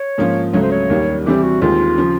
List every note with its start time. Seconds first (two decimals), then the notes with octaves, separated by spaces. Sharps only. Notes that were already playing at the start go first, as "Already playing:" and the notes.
Already playing: C#5
0.18 G#2 F3 A#3 C#4 F4
0.53 C#2 C#3 F#3 A3 C#5
0.63 C5
0.71 C#5
0.90 D#2 D#3 G3 A#3
1.26 C3 E3 G3 C4 G4
1.43 F#4
1.61 D#2 D#3 G#3 C4 F4
1.98 C#3 F3